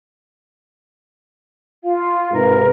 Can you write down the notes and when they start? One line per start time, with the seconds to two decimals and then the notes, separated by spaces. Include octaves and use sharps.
1.84 F4 F5
2.32 G#2 C3 A#4 B4